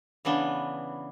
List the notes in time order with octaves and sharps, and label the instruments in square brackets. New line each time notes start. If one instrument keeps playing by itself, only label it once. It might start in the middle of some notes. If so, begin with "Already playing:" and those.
[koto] C#3 E3 B3 D4